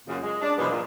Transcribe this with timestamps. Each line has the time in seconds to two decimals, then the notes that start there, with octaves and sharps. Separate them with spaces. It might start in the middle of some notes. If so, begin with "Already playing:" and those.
0.07 F#2 A#2 C#3
0.22 G#3
0.41 D4
0.58 F#2 B2 E3 F3 G#3 B3
0.70 A#2